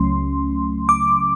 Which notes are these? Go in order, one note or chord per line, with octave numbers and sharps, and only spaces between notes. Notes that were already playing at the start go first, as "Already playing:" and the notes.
Already playing: C#2 C#3 F#3 A3 C#4 C6
D6